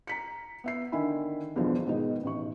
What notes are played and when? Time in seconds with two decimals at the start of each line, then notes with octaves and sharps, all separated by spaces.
0.07 A#5 B6 C#7
0.64 B3 E5 C7
0.92 D3 D#3 E5 G#5 B5
1.56 E2 G2 B2 D3 F3
1.86 G#2 B2 D#3 B3 D#4
2.23 A1 D#4 C#6